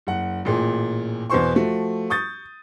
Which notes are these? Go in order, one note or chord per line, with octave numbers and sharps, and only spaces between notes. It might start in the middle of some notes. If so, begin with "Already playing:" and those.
F#1 F#5
A1 A#2 G#4
E2 B2 E3 C5 C6 C#6
F3 A3 F#4
C#6 D#6 G6 A6